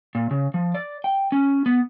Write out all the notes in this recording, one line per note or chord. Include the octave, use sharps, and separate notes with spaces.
A#2
C#3
F3
D5
G5
C#4
B3